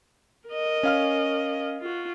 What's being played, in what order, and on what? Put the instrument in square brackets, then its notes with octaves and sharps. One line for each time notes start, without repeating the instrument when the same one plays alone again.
[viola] A#4 D#5
[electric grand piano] C#4 F5 F6
[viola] F4 F#4